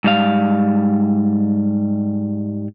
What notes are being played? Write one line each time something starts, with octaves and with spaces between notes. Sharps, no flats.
G#2 G3 F5